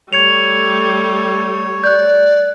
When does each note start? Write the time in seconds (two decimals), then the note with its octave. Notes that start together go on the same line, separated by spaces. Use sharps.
0.13 G3 A3 C#5 G#6 C#7 F7
1.84 D5 F#6 G6